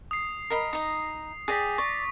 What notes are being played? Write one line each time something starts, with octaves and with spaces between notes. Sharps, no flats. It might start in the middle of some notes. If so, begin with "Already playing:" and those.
D#6 C7
A#4 D#5 B5
D#4 D#5
G#4 D5 G5 D#6 A#6 B6
D5 C#6